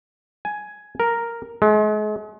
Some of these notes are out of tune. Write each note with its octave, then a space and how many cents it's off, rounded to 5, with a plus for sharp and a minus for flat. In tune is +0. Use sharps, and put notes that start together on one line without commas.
G#5 +10
A#4 +0
G#3 +40